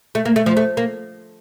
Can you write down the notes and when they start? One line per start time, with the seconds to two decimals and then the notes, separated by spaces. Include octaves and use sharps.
0.15 A3
0.25 A#3
0.36 A3
0.46 F3
0.57 A3
0.77 A#3